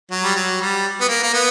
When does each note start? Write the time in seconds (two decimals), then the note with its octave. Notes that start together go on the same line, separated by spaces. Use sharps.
0.11 F#3
0.24 G3
0.35 F#3
0.61 G3
1.00 B3
1.08 A#3
1.23 A#3
1.34 B3